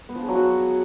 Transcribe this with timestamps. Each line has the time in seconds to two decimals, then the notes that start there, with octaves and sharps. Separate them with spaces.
0.09 B3
0.15 F3
0.22 G#4
0.28 F#3
0.35 F#4